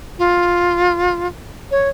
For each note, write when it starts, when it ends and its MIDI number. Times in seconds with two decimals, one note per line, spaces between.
0.19 1.27 65
1.71 1.89 73